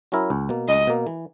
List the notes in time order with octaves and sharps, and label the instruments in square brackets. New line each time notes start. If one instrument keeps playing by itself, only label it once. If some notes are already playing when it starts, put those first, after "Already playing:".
[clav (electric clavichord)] F#3 C#4 E4 A#4
C#2
B2 A#3
[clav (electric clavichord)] C#2 [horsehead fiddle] D#5
[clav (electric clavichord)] B2 A#3
E3